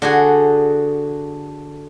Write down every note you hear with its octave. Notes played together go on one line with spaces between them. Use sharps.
D3 F#4 G#4